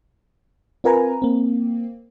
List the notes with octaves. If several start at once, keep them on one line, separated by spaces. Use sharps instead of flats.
C4 F4 A#4 B4 G#5 A#5
A#3 C4